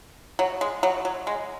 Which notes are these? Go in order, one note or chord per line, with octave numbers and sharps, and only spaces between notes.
F#3
G#3
F#3
F#3
G#3